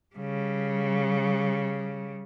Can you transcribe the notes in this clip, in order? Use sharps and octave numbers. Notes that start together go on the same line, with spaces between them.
C#3 G3